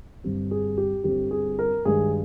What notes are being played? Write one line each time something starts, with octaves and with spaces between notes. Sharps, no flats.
G1 G2 G3 C4
G#4
G4
G1 G2 G3 C4 G4
G#4
A#4
G2 D#3 G#3 G#4